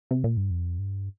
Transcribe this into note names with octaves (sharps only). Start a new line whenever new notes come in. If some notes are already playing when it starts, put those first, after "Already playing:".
C3
A#2
G2
F2
G2